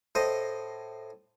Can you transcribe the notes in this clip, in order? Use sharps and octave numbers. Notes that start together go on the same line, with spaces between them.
A2 C5 D#5